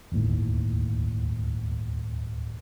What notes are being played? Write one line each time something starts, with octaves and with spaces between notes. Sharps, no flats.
D1 G1 D#2 A2